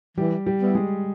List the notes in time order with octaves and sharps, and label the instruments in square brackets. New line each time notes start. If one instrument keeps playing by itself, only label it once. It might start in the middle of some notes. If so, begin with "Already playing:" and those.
[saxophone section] E3 [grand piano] G3 G4
[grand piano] G3 G4
[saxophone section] G3 B3 E4
[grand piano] G#3 G#4